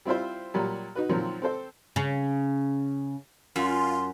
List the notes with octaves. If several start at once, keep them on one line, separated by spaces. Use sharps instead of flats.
G3 C4 E4 F4 C5
A#2 F#3 G3
D#4 F#4 B4
A#2 D#3 F3 F#3 C4
C4 A4 C5
C#3
F#2 F4 C6